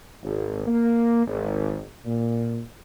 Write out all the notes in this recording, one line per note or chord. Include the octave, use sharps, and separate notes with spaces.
G#1
A#3
G#1
A#2